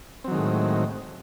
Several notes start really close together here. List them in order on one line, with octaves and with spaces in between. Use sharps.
C4 F#3 D#3 G#3 A2